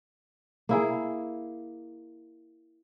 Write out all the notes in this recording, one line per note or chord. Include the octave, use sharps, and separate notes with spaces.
A#3 E4 G#4